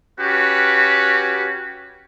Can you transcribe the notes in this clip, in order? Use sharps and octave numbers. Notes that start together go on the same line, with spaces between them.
C#4 F#4 G4 B4